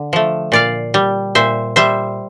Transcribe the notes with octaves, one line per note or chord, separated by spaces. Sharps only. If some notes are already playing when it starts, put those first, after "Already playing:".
Already playing: D3
F3 A3
A#2 D5 F5
G3
A#2 C5 E5
G3 C5 E5